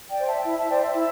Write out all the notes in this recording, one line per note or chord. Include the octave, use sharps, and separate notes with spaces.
D5 G5
C5
E5 A5
E4 E5
E5 A5
C5 D5 G5
E5
E4 E5